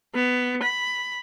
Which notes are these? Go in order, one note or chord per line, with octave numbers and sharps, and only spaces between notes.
B3
B5